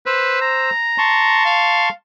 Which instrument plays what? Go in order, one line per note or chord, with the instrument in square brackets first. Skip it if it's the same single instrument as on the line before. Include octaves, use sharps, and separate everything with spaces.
[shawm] B4 [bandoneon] C5 E6
[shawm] A#5
[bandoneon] A5 C6 C#6
[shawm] F5